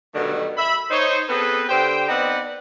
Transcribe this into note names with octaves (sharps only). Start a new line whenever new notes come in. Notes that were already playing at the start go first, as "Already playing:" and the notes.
B2 D3 D#3 F#3 G3 A3
E5 B5
D#4 C5 C#5
B3 C4 G#4 A4 B4
D3 G4 C5 G5
B3 C4 D#4 B4 D5 F#5